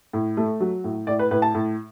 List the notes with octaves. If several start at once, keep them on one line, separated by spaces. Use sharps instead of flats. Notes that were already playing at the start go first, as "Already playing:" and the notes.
A2
A3
F#3
A2
A2 D5
B4
A2 B4
A5
A2